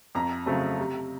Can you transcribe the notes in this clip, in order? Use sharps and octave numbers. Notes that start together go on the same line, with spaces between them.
F2 A#5
C#3 F#3 A3 C4
C3